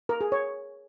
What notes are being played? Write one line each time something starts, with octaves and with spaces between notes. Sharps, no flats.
A#4
G#4
C#5